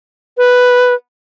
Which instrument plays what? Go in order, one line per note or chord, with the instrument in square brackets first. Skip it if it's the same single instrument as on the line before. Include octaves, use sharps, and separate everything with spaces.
[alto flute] B4